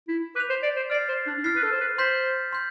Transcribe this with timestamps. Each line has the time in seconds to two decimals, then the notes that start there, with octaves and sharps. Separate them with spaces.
0.08 E4
0.35 B4 D6 G6 B6 F7
0.49 C5
0.63 D5
0.76 C5
0.90 D5 F6 A6 C7
1.09 C5
1.27 D4
1.37 D4
1.44 E4 F6 A6 C7
1.56 B4
1.63 A4
1.72 C5
1.81 B4
1.98 C5 C6 G6 B6
2.52 C6 G6